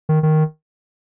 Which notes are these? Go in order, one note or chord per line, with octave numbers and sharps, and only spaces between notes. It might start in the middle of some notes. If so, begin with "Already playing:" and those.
D#3
D#3